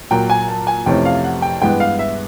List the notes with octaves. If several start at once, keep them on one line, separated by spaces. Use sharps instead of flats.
A#2 F#3 A#3 G5
G#5
A5
G#5
F2 C3 E3 A3 C#4 G5
F5
F#5
G5
G2 E3 G#3 B3 G5
F5
E5